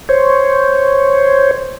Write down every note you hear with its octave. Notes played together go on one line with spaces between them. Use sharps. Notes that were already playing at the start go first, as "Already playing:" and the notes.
C5 C#5